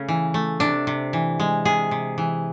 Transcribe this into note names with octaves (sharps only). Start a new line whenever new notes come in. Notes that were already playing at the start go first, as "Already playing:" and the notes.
Already playing: C#3 A3 C#4
E3
A3
C3 D4
C3
E3
G#3
C3 G#4
C3
E3